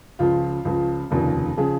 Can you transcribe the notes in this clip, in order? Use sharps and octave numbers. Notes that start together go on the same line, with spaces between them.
C#2 C#3 F3 F4
C#2 C#3 F3
F1 D#2 C#3 F3
C#3 F3 G#4